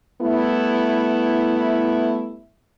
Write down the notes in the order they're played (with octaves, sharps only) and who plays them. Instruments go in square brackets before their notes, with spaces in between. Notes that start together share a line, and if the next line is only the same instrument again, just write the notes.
[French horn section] G3 A3 B3 E4